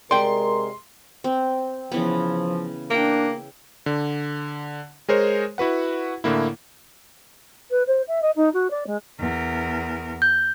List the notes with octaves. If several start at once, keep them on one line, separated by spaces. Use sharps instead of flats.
C3 G#3 A#4 D5 G5 C6
C4
C#3 E3 F3 B3
A#3 D4 E5 G5
D3
G#3 G#4 A#4 C5 C#5
E4 F#4 B4 F#5
A2 D3 A#3 E4
B4
C5
E5
D#5
D#4
F#4
D5
G#3
E2 A#4
G6